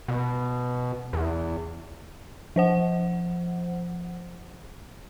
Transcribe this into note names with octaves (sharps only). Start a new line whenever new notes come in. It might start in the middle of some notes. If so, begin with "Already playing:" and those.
B2
E2
F3 C5 F#5